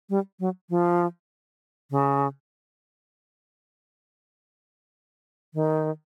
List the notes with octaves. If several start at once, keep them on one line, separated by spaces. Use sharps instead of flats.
G3
F#3
F3
C#3
D#3